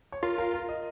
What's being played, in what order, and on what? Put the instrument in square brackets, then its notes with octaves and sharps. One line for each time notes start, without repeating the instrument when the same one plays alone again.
[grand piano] C#5
[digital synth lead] F4 [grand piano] A#4
[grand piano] A#4
A#4
D#5